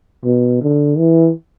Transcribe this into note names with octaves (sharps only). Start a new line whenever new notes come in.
B2
D3
E3